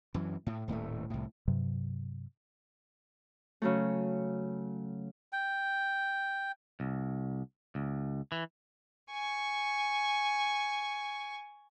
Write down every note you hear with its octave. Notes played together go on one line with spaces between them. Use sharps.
F#2 E3
A2
D#1 A2 G3 A3
C2 A2
G2 C3 F#3
C#3 F#3 A3
G5
C2
C#2
E3
G#5 C#6